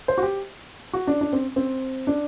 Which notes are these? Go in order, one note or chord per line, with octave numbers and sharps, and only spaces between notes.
C5
F#4
G4
F#4
D4
D4
C4
C4
D4